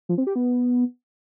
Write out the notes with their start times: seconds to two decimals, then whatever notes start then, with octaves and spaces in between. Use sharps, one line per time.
0.09 F3
0.18 C4
0.27 G4
0.36 B3